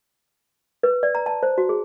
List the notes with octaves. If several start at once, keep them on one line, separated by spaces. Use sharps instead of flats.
B4
D5
A#5
A5
C5
F#4
G#4